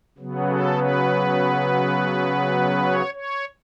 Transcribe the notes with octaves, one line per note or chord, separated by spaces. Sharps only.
C#3 F#3 B3
A4
B4
C#5
C#5